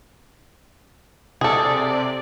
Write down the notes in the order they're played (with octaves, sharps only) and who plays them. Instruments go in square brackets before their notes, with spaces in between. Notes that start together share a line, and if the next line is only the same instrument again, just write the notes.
[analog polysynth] C3 D5 [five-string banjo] G#4 A4